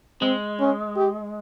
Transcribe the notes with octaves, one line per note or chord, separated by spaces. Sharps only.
G#3 C4
C#4
G4